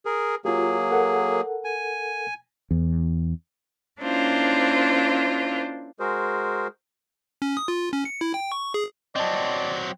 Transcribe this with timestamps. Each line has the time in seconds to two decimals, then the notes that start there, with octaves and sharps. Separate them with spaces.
0.06 G#4 A#4
0.45 F#3 A#3 F4 G4 G#4
0.92 A4 A#4 F#5
1.64 G#5
2.71 E2
4.01 A#3 C#4 D4 E4 F4 C5
6.00 G#3 F#4 G#4 A#4 C5
7.42 C#4
7.57 D#6
7.68 F4
7.93 C#4
8.05 C#7
8.21 E4
8.34 G5
8.52 C#6
8.74 G#4
9.16 F#3 C4 D5 D#5 A5